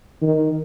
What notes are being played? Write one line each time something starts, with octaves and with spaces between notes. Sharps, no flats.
D#3